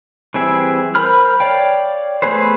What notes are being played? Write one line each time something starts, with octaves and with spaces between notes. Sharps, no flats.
E3 G3 C4 G#4 E5
A#4 C5 B5 F6
C#5 D5 F5 G5
A3 B3 G#4 B4 C5